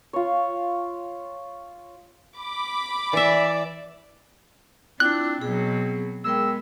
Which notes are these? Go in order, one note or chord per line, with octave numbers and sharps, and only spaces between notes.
F4 C#5
B5 D6
E3 D5 E5
C4 D4 E4 F4 D6 F#6
B2 F#3 G#4
G#3 B3 G#4 A#4 G5 E6